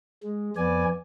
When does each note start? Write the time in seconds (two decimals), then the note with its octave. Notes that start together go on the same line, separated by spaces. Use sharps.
0.23 G#3
0.56 F2 B3 D5 G#5